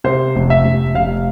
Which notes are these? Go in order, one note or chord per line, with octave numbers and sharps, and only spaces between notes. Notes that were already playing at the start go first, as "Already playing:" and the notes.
C3 C5
F1
E5
F1
F1 F5